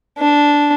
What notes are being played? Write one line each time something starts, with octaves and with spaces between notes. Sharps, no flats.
D4